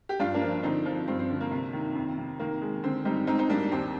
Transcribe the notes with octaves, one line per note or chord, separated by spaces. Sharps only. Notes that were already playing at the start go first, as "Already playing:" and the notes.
G4
G2 D4 F4
A#3 D4
F3
D3 C4 D#4
F3
G2 C4
C4
D3
A#3
C3
D#3
F2
C3
D#3 A#3
G#3
D3 C4
G3 C4 D#4
G#2 C4 D#4
C4 D#4
G3 A#3 D4
D#2 C4